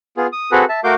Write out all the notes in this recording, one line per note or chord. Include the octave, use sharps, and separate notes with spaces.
B3 F4 G#4
D#6
C4 F#4 G#4 A4 B4
E5 A5
A3 F#4 A#4 F5 D6 G6